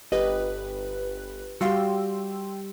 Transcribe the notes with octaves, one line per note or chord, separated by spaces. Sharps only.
G1 G4 B4 D#5 F#6
G3 F#4 G4 F5 G5 C6 E6